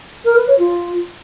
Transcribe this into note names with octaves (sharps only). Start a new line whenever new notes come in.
A#4
B4
C#5
F4